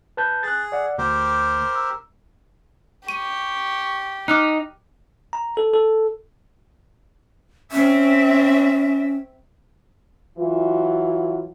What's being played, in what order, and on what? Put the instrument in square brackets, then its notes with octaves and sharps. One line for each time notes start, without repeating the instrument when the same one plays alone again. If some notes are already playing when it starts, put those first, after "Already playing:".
[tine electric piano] B4 A5 G6
[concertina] G#4 [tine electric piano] F#6 A6
[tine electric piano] D5 F#5
[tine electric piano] D2 [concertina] G4 A#4 C5
[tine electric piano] A#5 E6
[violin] G4 [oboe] C#6 [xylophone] D#7
[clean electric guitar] D#4 [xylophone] D6 F6 F#6
[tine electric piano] A#5
A4
A4
[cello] C4 E5 [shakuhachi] C#4
[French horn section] E3 F#3 F4